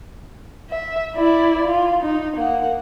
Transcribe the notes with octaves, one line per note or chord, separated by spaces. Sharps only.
E5
E4 D5
F4
D#4
A#3 F#5